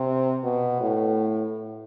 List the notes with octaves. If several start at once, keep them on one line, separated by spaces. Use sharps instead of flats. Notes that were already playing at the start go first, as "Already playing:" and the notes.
Already playing: C3
B2
A2